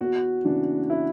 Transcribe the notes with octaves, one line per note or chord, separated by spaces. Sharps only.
E2 F#4
C#3 E3 D4
E4